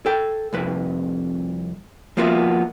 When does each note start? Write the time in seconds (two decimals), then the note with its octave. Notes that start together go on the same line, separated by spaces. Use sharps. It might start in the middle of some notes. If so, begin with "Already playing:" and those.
0.06 A4 G5
0.53 C2 F2 B4
2.17 F3 A#3 B3 F4 F#4 E5